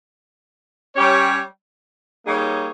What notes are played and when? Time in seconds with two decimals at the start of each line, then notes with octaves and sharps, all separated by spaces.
0.95 G3 C#4 G4 C#5
2.26 G3 A#3 D#4 G#4 C#5